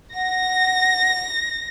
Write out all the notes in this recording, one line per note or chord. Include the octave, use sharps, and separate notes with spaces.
F#5 A#6